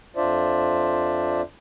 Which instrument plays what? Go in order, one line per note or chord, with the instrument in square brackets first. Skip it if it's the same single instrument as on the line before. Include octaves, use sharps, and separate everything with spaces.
[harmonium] F2 D4 F4 C5 D5 E5